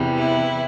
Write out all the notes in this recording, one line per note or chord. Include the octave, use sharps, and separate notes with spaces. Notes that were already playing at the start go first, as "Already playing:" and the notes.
Already playing: E2 C3 E3 G3
E4